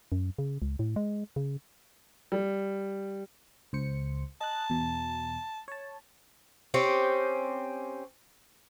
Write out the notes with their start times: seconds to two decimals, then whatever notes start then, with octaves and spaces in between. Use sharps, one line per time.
0.12 F#2
0.38 C#3
0.62 C#2
0.79 A2
0.96 G#3
1.36 C#3
2.32 G3
3.73 C#2 C5 C#7
4.41 D#5 A5 F#6
4.70 E2 B2
5.68 C#5 A5
6.74 C4 C#4 G4